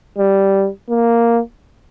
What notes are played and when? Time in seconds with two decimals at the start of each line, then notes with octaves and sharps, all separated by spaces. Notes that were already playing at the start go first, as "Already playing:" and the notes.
0.18 G3
0.89 A#3